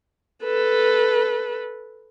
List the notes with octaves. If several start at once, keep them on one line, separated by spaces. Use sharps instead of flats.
A4 B4